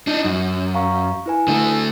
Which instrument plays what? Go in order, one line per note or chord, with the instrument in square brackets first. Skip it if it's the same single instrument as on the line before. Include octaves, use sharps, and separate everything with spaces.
[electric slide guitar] D4 D#4
F#2
[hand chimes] F5 A#5 C#6
E4 B4 G#5
[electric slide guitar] D3 A3